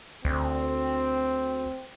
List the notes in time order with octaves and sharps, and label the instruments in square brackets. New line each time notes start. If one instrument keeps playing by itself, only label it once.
[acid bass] D2 [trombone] C4